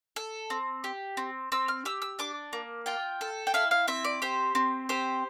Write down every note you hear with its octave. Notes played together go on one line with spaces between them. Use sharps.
A4
C4
G4
C4
C4 E6
F6
G4 E6
E6
D4 D6
A#3
F4 G5
A4
G5
E4 F5
F5
C4 E5
D5
G4 C5
C4
G4 C5